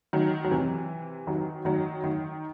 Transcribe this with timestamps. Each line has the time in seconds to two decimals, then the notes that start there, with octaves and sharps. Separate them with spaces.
0.13 D#3 F#3
0.44 F#3
0.51 C3 E3
1.27 D#3 F#3
1.65 D#3 F#3
2.04 D#3